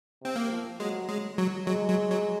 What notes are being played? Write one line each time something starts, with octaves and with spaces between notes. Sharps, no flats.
C3 C4
A#3
F3
F#3 G#3
G#3
F#3
F#3 G#3
F#3
F#3